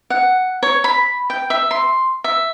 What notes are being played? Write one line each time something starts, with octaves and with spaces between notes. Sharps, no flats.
F#5
C#5
B5
G5
E5
C6
E5